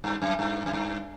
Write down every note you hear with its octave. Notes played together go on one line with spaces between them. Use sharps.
G2
F#2
G2
F#2
G2